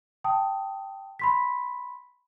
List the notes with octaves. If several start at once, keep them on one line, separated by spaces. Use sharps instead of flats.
G5 A5 D#6
B5 C6 B6